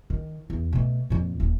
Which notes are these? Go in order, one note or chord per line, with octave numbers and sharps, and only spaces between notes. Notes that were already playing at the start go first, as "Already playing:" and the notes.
D#3
E2
B2 A3
F2 A#2
D#1